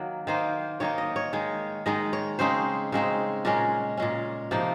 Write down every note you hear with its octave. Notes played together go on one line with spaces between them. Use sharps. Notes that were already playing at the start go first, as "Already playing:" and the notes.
Already playing: D#3 F#3 A#3
D#3 A#3 D#4 C5
D#3 A#3 D#4 C#5
D#5
C#5
D#3 G#3 D#4
D#3 G#3 D#4 D#5
C#5
C#3 G#3 C4 D#4 C5
C#3 G#3 C4 D#4
A#2 G#3 C#4 A#4
A#2 G#3 C#4
C3 F3 A#3 D#4